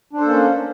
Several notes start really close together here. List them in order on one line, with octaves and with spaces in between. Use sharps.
D4 C5 A4 A#3 C#4